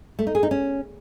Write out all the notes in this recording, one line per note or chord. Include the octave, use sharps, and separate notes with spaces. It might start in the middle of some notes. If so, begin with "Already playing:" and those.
A3
D#4
G#4
D#4
C#4